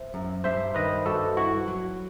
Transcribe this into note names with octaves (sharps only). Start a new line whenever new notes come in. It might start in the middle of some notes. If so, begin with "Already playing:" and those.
Already playing: C5 E5
F#2
G2 C5 E5
D#3 B4 D#5
G2 F#4 A4
E4 F#4
F#3